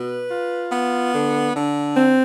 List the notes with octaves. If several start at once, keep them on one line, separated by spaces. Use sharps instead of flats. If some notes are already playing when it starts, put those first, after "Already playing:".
Already playing: B2 B4
F4
B3
D3
D3
C4